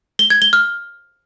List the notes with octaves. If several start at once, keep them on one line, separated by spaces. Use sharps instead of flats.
G7
G#6
G7
F6